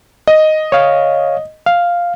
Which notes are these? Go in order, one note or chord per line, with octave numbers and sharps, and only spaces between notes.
D#5
C#5 F5
F5